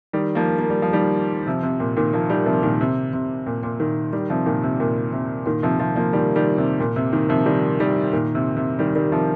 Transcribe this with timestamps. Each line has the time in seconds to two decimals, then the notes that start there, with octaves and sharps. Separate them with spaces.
0.13 D#3 G3
0.35 F3 A#3
0.59 A#3
0.70 G3
0.82 F3
0.93 D#3 G3
1.47 C3 F3
1.63 C3
1.80 A#2
1.97 A#2 D#3
2.13 F3 A#3
2.30 D#3 G3
2.46 C3 F3
2.63 A#2 D#3
2.81 C3
3.13 C3
3.46 A#2
3.63 A#2
3.80 A#2 D#3
4.13 D#3 G3
4.30 C3 F3
4.46 A#2 D#3
4.63 C3
4.80 A#2
5.13 C3
5.46 A#2 D#3
5.63 C3 F3
5.79 C3 F3
5.96 F3 A#3
6.13 D#3 G3
6.36 D#3 G3
6.58 C3
6.80 A#2
6.96 C3
7.12 A#2 D#3
7.29 C3 F3
7.46 D#3 G3
7.80 D#3 G3
8.13 A#2 D#3
8.35 C3
8.57 C3
8.79 D#3 G3
8.95 D#3 G3
9.12 C3 F3